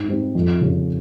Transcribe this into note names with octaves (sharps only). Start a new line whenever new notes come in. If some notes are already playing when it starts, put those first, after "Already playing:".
Already playing: G#2
G3 C4 D#4
F2
C#3 G3 C#4